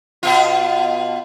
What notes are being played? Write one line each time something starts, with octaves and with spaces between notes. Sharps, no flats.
B2 F4